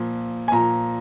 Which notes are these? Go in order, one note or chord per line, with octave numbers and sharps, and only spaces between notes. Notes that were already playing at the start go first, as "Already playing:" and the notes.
Already playing: A#2 F3
G#5
A#2 F3 A#5